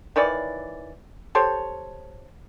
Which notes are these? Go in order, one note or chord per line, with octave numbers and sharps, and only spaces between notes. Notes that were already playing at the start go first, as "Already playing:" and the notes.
D#3 E3 C#5 D5
G4 A4 C5 C#5